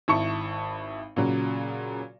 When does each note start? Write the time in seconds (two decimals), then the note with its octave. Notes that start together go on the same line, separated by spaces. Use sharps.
0.08 G#1 E4 A5 C#6 C#7
1.16 A#2 C#3 F#3